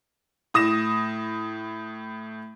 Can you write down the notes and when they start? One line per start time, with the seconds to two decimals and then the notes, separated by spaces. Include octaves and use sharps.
0.54 A2 D#6 A#6 E7